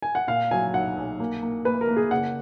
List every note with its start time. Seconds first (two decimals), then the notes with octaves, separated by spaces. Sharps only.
0.02 G#5
0.15 F#5
0.28 A#2 F5
0.51 F#3 G#5
0.74 B1 F#5
0.97 B1
1.20 A#3
1.42 A#3
1.65 A#3 B4
1.81 A#4
1.88 A#3
1.96 G#4
2.11 F#1 F#5